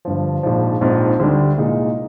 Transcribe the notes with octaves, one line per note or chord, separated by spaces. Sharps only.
G1 G2 F3
A#1 G#2 F3
A#1 G#2 F3 C4 F4
D2 D3 G3 D4
C2 A#2 G#3 D#4